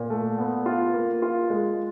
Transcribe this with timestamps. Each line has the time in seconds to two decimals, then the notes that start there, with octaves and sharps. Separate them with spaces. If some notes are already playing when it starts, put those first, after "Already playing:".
Already playing: A#2
0.10 A3
0.38 B3
0.66 F4
0.94 A#3
1.22 F4
1.50 G#3